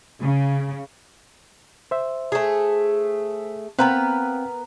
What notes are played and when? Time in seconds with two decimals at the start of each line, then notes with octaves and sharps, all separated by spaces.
0.21 C#3
1.91 C5 E5
2.32 A3 G#4
3.79 B3 C4 A#4 B4 F5 G5